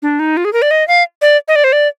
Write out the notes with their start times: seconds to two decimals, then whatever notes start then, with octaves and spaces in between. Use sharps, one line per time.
0.02 D4
0.19 D#4
0.37 F4
0.45 G#4
0.53 A#4
0.62 D5
0.71 D#5
0.88 F5
1.22 D5
1.48 D#5
1.56 D5
1.64 C5
1.73 D5